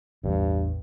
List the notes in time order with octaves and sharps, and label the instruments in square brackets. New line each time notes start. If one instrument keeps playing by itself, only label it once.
[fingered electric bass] A1 E2 [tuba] G2